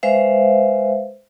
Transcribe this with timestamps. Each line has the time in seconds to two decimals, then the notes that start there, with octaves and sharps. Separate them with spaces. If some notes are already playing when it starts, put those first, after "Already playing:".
0.03 G#3 B4 C5 E5 F5